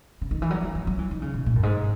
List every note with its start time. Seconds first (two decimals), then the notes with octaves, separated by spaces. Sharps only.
0.21 C#3
0.31 D#3
0.42 E3
0.51 F#3
0.63 E3
0.75 E3
0.87 F#3
0.99 E3
1.11 D#3
1.22 C#3
1.34 B2
1.46 A#2
1.56 F#2
1.63 G#2